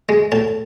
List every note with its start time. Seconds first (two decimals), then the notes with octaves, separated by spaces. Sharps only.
0.09 G#3
0.32 A2 A5